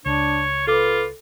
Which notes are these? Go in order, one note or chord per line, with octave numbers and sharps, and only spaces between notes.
C#2 D4 C#5
F4 A4 B4 D6